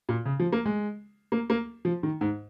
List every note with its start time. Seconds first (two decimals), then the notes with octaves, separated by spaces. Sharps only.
0.09 A#2
0.26 C#3
0.40 F3
0.53 A#3
0.66 G#3
1.32 A#3
1.50 A#3
1.85 F3
2.03 D#3
2.21 G#2